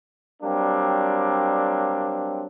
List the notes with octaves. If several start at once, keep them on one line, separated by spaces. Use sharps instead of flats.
F#3 G3 A#3 C4 D4